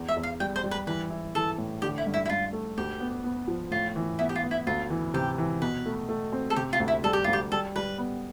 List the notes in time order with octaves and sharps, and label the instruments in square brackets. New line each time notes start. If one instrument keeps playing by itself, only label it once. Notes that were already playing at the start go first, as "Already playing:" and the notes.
Already playing: [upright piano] E2
[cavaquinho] E5
[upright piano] E2
[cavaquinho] F5
[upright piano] G3 [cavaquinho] G5
[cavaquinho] C5
[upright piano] G3
[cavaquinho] B4
[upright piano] E3 [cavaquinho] B4
[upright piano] E4
[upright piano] E3 [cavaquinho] A4
[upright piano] A2
[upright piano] D3 [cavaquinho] G4
[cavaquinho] E4
[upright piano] G2
[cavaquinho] E4
E4
[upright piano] G2 [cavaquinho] F4
[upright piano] A3
[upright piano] D2 [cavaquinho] G4
[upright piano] B3
B3
F3
[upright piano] A2 [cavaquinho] F4
[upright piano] E3
[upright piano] B3 [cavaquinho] E4
[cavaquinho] G4
F4
[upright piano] B3
[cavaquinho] E4
[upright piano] D2 [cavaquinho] F4
[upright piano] E3
[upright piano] C3 [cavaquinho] G4
[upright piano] E3
[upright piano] B2 [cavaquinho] B4
[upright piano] A3
A3
C4
[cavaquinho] A4
[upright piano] C3 [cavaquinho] G4
[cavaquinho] F4
[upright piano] D2
[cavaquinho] E4
[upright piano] G3 [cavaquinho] A4
[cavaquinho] G4
[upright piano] D2 [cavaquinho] F4
[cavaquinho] G4
[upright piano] G3 [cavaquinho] A4
[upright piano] G3 [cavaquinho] B4
[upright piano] B3